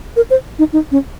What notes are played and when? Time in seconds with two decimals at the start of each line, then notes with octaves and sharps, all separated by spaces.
0.16 A#4
0.30 C5
0.59 D#4
0.73 D#4
0.92 C#4